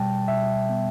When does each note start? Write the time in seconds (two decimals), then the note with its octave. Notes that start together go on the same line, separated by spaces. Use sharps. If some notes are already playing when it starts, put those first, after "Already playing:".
Already playing: B2 G3 G5 A5
0.28 B2 E5
0.70 B3